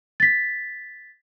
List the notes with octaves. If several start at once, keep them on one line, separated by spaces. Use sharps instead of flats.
A6 B6